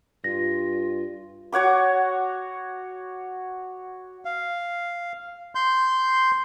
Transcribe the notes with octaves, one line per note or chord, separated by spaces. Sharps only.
G2 F4 A#6
F#4 C#5 F#5 D6
F5
C6 G6